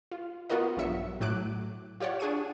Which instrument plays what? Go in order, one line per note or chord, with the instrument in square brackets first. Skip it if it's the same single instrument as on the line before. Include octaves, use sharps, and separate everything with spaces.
[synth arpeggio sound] F4
B3 F4 F#4 A#4 D#5
A#1 G2 F#3 E5 C#7
A2 F#3 D6 F#6 D7
F4 G4 C#5 D5 F#5
D4 G#4 C#6 D#7